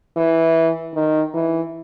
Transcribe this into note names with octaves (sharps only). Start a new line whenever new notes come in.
E3
D#3
E3